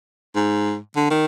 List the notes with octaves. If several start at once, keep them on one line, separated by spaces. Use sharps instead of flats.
G#2
D3
D#3